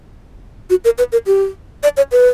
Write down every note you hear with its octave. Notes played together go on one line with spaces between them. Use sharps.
F#4
A#4
B4
A#4
G4
D5
C#5
B4